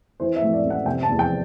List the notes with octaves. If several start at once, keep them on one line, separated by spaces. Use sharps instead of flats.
E3 C5
E5
A2
D5
A1
F#5
C3 G5
A5
E2
G5